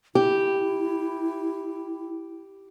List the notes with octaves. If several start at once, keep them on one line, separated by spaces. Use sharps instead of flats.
E4 G4